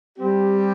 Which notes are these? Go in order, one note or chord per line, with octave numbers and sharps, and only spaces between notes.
G3 C4 G4